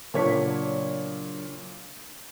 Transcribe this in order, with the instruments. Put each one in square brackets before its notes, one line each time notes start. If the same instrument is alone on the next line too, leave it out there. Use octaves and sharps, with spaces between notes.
[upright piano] A#2 C#5 B6 [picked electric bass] C#3 F#3 D4